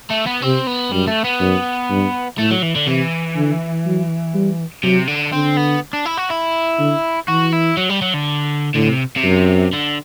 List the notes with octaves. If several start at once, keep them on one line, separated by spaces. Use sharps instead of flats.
A3
B3
C3 C4
B3
F#2 G3
A3
B3
F#2
G2
A2 A3
F#3
E3
D3
C3 E3
D3
F#3
G3
C3 F#3
D3
D3 C4
B3
D4
E4
F#4
E4
D3
E3 F#4
E4
F#3
G3
F#3
D3
A2 D3
C3
C3
F#2
D3